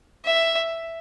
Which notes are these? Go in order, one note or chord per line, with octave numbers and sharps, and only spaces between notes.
E5